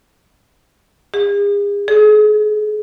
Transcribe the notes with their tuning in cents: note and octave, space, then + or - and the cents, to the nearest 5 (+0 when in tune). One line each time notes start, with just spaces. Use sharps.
G#4 -40
G#4 +35